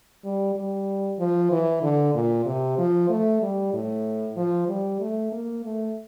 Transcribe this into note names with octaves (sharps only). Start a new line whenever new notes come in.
G3
G3
F3
E3
D3
A#2
C3
F3
A3
G3
A2
F3
G3
A3
A#3
A3